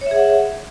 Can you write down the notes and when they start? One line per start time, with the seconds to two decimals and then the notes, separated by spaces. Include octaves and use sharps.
0.01 C#5
0.06 E5
0.11 G#4
0.16 F#5